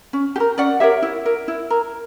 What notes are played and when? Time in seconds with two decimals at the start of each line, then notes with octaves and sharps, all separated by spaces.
0.13 C#4
0.36 G4
0.40 A#4
0.58 C#4 D5 F#5
0.80 G4 A#4 C#5 E5
1.02 E4
1.25 A#4
1.48 E4
1.70 A#4